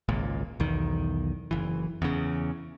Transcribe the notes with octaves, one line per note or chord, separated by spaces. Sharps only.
G#1 C#2 A#2
B1 E2 D#3
F#1 E3
E2 C#3